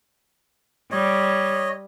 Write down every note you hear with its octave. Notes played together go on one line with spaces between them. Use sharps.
G3 C#5 D#5